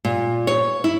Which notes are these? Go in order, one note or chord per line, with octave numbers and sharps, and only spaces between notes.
A#2
C#5
E4